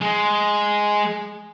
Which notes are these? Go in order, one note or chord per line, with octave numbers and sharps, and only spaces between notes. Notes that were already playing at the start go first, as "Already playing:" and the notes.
G#3